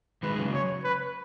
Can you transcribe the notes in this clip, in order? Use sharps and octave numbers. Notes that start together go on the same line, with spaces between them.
D#3 G#3 B4
C#3 F#3
C#5
B4